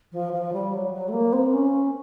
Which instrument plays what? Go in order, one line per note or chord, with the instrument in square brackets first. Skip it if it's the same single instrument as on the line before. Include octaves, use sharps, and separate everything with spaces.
[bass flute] F3
F3
G3
F#3
F#3
A3
A#3
C4
C#4